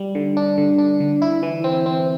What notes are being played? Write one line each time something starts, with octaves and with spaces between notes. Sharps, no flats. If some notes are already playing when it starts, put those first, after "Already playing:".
Already playing: G3
D3
D4
D3
D4
D3
E4
E3
C4
C4